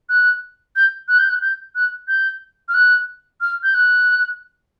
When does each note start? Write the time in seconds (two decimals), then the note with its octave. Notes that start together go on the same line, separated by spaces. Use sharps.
0.09 F#6
0.76 G6
1.08 F#6
1.19 G6
1.29 F#6
1.42 G6
1.75 F#6
2.08 G6
2.68 F6
2.74 F#6
3.41 F6
3.63 G6
3.74 F#6